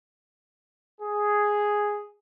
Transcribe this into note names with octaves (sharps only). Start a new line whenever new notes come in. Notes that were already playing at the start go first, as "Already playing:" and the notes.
G#4